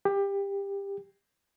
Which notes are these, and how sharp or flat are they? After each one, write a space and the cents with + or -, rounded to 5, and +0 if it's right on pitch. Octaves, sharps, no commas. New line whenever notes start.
G4 +20